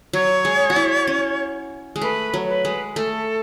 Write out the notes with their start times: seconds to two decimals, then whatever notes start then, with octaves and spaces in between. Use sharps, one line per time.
0.13 F#3 C#5
0.45 G#3
0.70 F#4
0.76 E4
1.07 C#4
1.96 G#3
2.01 A3 B4
2.34 F#3
2.49 B4
2.65 G#3
2.96 A3 A4